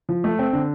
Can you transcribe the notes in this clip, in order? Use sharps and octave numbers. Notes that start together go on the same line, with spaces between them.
F3
A3
C4
D3